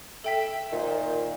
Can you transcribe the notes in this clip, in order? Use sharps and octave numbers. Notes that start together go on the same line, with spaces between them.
A4 E5 G5 B6
A#2 D#3 C5